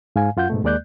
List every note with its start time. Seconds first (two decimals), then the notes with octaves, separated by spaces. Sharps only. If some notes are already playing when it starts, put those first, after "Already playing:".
0.16 G#2 F5 G#5
0.37 F#2 F4 F#5 G6
0.50 G#2 B2 A3
0.64 D#2 G#3 A#3 D5 F#6 G6